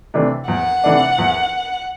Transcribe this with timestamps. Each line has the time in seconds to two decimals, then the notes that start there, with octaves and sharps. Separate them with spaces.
0.14 C3 E3 A3 D4
0.48 E2 F#5
0.84 C3 E3 A3 D4
1.18 E2